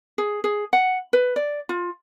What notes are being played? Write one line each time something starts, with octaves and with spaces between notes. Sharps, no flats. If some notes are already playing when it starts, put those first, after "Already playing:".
G#4
G#4
F#5
B4
D5
F4